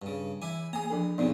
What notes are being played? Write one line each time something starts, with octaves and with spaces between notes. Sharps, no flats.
G2 C#3
E3 E4 G#5
A#3 G#4 G#5 A#5
F3 D4 A4
F2 A#2 C#3 B3 D#4 D5